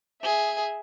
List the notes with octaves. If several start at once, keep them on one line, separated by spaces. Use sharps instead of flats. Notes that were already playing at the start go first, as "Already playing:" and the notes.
G#4 E5